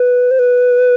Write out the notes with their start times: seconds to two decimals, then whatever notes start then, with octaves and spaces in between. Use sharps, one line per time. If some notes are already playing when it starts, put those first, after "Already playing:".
Already playing: B4
0.31 C5
0.39 B4